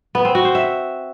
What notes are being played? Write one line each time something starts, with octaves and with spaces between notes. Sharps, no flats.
B3
C4
F#4
C5
E5